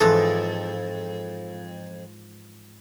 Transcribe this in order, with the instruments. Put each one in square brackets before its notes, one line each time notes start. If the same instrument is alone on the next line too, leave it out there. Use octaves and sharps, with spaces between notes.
[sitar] F2 [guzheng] G#2 E3 G#4 [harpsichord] A4